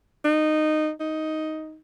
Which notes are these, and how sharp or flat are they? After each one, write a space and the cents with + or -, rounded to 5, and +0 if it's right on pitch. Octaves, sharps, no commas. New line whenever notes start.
D#4 -15
D#4 +10